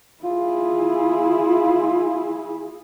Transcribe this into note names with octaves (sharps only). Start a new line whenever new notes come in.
E4 F4 G#4